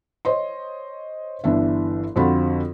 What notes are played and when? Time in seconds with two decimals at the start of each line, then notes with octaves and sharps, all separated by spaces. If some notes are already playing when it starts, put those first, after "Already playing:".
0.25 C5 C#5 D#5 C6
1.44 G1 E3 D4 E5
2.16 F2 D3 C4 F4 F#4 B5